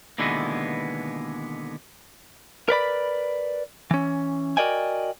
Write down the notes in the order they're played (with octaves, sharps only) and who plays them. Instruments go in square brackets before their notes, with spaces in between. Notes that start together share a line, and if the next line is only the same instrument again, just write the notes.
[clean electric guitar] D#2 B2 D3 E3 G#3 B3
A#4 B4 D5 B5
E3 C#4
F#4 A#4 D5 D#5 G5 G#5